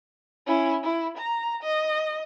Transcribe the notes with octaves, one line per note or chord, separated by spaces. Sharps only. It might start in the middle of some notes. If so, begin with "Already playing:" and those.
C#4 E4
E4
A#5
D#5